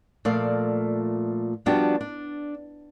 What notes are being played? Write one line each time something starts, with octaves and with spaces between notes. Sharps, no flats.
A#2 F3 A3 D5 F5
F3 G3 B3 D4 F#4 G4
D4